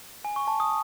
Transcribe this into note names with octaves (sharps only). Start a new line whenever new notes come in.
G#5
C#6
A5
D#6